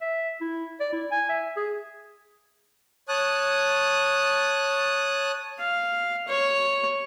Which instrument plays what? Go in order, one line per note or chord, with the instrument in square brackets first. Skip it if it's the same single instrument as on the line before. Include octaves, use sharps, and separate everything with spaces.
[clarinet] E5
E4
D5
E4
G#5
E5
G#4
[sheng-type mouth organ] C#5 A5 D#6 F#6
[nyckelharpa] F5
C#5